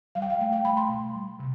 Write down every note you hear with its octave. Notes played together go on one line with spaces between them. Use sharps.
G3 F5
G5
F5
A3 G5
G5
A3 B5
C6
B2
G3
C3